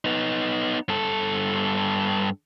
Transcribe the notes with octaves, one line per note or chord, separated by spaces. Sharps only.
B3 D#4
G2 A4